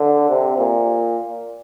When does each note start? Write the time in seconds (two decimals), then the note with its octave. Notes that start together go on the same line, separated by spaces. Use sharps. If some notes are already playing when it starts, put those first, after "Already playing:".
Already playing: D3
0.29 C3
0.58 A#2